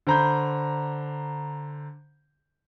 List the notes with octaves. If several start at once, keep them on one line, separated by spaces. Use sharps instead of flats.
D3 C5 A#5 B5 G6